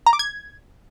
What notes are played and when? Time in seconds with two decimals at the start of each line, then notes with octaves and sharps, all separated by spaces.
0.06 A#5
0.13 D6
0.19 G#6